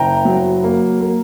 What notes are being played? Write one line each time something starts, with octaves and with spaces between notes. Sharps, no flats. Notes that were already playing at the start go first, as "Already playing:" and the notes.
Already playing: F#1 G5 A#5
F#3
A#3
A#3